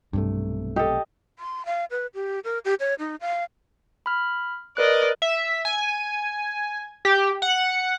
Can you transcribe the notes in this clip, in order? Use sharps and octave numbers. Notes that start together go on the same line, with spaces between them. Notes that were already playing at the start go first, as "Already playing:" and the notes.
B1 G2 C3 A3
G4 A4 D#5
C6
F5
B4
G4
A#4
G4
C#5
D#4
F5
B5 F6
A#4 B4 D5 D#5 F#6
E5
G#5
G4
F#5